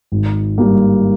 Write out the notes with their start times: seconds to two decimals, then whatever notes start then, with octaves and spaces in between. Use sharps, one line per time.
0.12 G#1
0.58 G2 G3 A#3